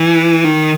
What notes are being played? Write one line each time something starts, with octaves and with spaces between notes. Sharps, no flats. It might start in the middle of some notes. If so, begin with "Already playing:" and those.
Already playing: E3
D#3